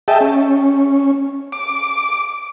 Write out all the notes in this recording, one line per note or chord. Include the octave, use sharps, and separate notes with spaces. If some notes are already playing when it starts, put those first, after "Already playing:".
G#4 D#5 E5 G5 A5
C#4
D6